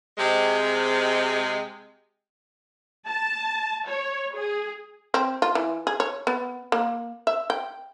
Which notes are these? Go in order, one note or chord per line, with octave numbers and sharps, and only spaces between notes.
C3 G#3
A5
C#5
G#4
C4
F4
E3
G#4
C#5
B3
A#3
E5
G5